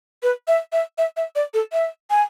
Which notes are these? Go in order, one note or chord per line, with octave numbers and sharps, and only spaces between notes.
B4
E5
E5
E5
E5
D5
A4
E5
G#5